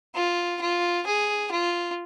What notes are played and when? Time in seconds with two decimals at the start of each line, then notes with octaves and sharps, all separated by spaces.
0.15 F4
0.61 F4
1.06 G#4
1.51 F4